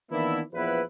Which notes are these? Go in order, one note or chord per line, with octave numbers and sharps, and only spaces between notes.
D#3 E3 A#3 B3 D4 E4
A#1 E2 F3 B3 E4 B4